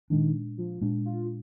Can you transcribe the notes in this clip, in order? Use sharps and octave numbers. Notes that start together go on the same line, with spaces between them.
A#2 D#3 G#3 D4
F3
A#2 G#3 D4
F4